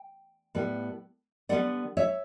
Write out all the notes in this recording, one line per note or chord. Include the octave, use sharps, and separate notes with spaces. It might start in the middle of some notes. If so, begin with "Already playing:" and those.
Already playing: G5
A2 G3 B3
D3 G3 B3 D5 F#5
C#5 E5